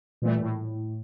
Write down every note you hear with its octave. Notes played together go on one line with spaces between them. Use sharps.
A#2 E3 G3 A3
A2